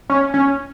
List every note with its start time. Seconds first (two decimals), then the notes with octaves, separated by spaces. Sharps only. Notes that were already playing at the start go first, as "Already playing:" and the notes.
0.10 C#4
0.34 C#4